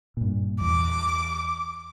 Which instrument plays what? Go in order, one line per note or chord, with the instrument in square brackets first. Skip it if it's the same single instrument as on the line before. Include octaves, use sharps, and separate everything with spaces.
[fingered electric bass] G2 A#2
[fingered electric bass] E2 [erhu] D6